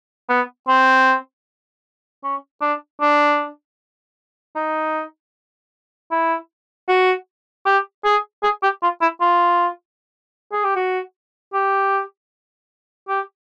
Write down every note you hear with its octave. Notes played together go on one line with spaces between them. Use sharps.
B3
C4
C#4
D4
D4
D#4
E4
F#4
G4
G#4
G#4
G4
F4
E4
F4
G#4
G4
F#4
G4
G4